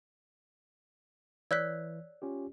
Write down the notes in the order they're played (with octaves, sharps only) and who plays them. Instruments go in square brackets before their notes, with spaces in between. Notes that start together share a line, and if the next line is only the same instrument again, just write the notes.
[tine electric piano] E3 [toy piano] C#5 D5 [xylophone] E6 F#6 B6
[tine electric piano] C#4 F4 G4